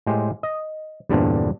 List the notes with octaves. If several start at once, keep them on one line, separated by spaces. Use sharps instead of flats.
A2 G#3 G4 C5
D#5
E2 G2 A#2 D3 C4 D4